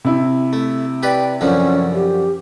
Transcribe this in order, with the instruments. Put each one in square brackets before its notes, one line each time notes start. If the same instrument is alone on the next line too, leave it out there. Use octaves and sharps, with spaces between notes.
[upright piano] C3 E4
[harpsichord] A3
[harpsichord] G4 B4 D5 [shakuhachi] G5
[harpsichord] F#2 D3 F3 [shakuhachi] C#4
[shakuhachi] G4